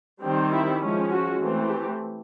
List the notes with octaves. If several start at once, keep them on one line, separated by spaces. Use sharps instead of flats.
D#3 G3 C4
E4
F3 G#3 C#4
F#4
E3 A3 C4
G4